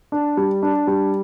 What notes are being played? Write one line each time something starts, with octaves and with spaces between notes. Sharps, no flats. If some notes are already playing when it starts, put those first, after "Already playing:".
D4
G3
D4
G3